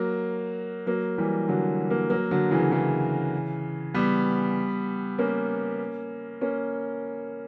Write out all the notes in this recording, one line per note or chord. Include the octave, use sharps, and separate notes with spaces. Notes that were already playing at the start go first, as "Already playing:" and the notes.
Already playing: F#3 A#3
F#3 A#3
E3 G3
D3 F#3
F#3 A#3
F#3 A#3
D3 F#3
C#3 E3
C#3 E3
G3 B3
A#3 C#4
A#3 C#4